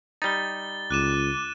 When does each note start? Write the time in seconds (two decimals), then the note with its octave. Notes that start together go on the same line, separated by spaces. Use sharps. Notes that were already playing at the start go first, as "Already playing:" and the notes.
0.22 G3 D#4 A6 G7
0.91 C#2 D6 F#6 D#7 E7